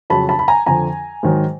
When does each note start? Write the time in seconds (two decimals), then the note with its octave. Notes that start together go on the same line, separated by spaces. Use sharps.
0.10 F2 C#3 F#3 A5 B5
0.29 A5 B5
0.39 B5
0.48 G#5 A#5
0.66 F2 D3 F3 G#5 A#5
1.23 G#2 D#3 F#3